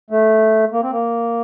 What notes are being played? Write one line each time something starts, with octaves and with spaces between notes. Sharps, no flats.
A3
A#3
C4
A#3